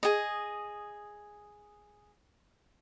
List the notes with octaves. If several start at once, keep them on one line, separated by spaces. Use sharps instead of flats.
G#4 D#5